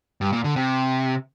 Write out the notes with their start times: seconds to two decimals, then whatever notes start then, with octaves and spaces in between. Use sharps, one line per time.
0.21 G2
0.33 A#2
0.44 D3
0.56 C3